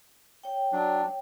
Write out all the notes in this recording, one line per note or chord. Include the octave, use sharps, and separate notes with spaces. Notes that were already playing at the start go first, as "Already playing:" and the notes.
C#5 G5
F#3 D4